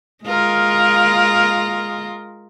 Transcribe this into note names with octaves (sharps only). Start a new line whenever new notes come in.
G#3 F4 A#4